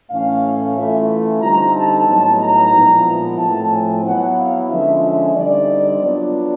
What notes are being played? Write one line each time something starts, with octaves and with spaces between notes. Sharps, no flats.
A2 E3 A3 C#4 F5
E3 A3 C#4 F4 E5
D3 G3 C4 D#4 A#5
A5
A2 F#3 B3 D#4 A5
A#5
A#2 F3 G#3 B3 E4
A2 F3 A3 C4 A5
G#5
F#3 B3 E4 F#5
F5
D3 F3 G#3 C#4 F4 E5
E5
D3 G3 C4 D#4 D5
F#3 B3 D4 F4